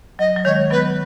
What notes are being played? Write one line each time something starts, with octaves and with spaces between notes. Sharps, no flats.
F#3 D#5
F#3
D#3 G#3 C#5
F#3 B3 B4